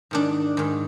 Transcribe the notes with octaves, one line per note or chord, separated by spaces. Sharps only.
G#2 D#3 D4
G#2 D#3